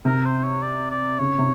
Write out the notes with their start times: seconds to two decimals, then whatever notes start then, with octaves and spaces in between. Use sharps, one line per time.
0.05 C3 A#4
0.25 C5
0.44 C#5
0.62 D5
0.91 D5
1.19 C#3 C#5
1.38 C3